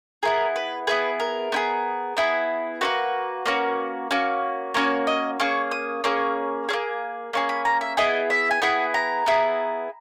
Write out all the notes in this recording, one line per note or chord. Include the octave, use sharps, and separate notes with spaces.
B3 E4 G#4 A#4
B4
B3 E4 G#4 B4
A#4
B3 E4 G#4
B3 E4 G#4
A#3 C#4 F#4 B4
A#3 C#4 F#4
A#3 C#4 F#4
A#3 C#4 F#4 C#5
D#5
A#3 C#4 G#4 C#6
D#6
A#3 C#4 G#4
A#3 C#4 G#4
A#3 C#4 G#4
B5
A#5
E5
B3 E4 G#4 D#5
E5
G#5
B3 E4 G#4 F#5
A#5
B3 E4 G#4